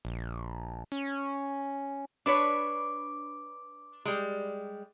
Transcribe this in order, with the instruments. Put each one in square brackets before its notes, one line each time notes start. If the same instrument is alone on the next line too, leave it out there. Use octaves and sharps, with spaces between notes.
[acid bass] A#1
C#4
[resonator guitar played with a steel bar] D4 B4 C#5 [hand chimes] D6 D7
[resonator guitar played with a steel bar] G3 G#3